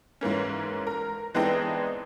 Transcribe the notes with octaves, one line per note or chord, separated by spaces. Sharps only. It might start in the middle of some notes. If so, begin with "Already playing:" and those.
G#2 E3 A#3 C#4
A#4
E3 G#3 B3 C4 D4 D#4